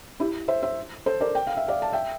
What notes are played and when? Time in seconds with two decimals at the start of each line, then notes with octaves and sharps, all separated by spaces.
0.20 E4 G4
0.48 C5 E5
0.63 C5 E5
1.06 A4 C5
1.21 A#4 D5
1.35 G5
1.47 F5
1.57 E5
1.68 D5 F5
1.82 A5
1.93 E5 G5